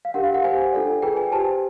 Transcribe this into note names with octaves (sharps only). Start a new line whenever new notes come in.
F5
D4 G4 A#4 F#5
F5
F#5
G4 C5 G#5
D4 F4 A4 D5
F4 G#4 B4 G5
G#5
G4 C5 A5